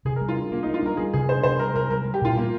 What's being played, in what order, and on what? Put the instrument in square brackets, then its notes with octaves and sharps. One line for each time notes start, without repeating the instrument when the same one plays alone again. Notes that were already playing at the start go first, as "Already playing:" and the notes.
[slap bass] C3 [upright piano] G#4
[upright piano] A#4
[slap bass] G3
[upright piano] F4
[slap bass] D4
[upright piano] A#3 [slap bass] D4
[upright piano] D#4
[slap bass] D4
[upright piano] F4
[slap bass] G3 [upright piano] A#4
[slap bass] G3 [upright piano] G#4
[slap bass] C3 [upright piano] G#4
[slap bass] D4 [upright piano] C5
[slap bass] C3 [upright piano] C5
[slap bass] G3 [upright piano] A#4
[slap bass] C3 [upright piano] A#4
[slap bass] G3 [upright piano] A#4
[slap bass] G3
[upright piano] G4
[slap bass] A#2 [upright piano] F4
[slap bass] G3 [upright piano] A#3